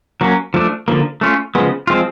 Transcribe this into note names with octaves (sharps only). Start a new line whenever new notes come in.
F#3 A#3 C#4
F3 A3 D4
D3 F3 A#3
A3 C#4 F4
C#3 F3 G#3 B3
F3 G#3 C4 F4